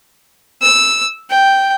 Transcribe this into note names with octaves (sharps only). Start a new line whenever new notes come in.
E6
G5